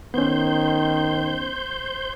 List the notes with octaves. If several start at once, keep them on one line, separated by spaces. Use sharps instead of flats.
D#3 B3 C#4 C5 G6